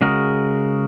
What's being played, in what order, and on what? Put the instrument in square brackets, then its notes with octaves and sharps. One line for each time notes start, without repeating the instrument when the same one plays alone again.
[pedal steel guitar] C#3 G#3 F#4 A#4